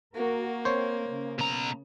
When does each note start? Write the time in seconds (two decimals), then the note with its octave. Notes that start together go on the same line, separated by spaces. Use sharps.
0.15 A#3 F#4 A#4
0.65 C4 C5 C#5
1.08 C#3
1.39 B2 A#5